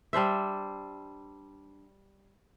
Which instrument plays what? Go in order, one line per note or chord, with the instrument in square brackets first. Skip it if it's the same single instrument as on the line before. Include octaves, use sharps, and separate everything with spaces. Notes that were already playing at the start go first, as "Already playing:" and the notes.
[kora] G3 D4 C5 E5